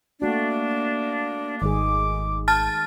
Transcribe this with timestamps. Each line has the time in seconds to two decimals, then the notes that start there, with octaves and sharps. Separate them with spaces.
0.22 A3 A#3 D4 F#4
1.62 G#1 D#3 G#3 G#4 D6
2.48 A5 F6 A6